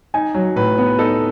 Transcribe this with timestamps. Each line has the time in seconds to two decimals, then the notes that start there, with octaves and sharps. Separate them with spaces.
0.14 D#4 G#5
0.34 F#3
0.56 A2 B4
0.78 B3
0.99 D#4 A4